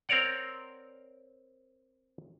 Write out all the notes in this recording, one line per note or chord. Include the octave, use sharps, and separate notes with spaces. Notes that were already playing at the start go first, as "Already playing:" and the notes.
C4 A#4 C#5 D5 F#5